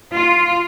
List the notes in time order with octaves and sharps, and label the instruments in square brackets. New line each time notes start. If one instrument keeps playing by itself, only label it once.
[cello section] F4